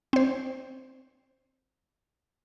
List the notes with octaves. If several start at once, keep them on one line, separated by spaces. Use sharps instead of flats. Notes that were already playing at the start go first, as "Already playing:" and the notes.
C4 C5